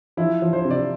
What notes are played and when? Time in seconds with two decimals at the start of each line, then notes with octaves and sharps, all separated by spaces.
0.17 F3 E4
0.42 F3
0.53 C5
0.65 C3
0.71 D5